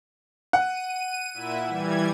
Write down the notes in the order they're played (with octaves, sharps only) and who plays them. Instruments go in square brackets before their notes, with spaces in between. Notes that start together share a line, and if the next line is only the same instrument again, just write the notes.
[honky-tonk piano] F#5 [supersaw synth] D#7
[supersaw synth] A#2 E4 E5
E3 G3 G#6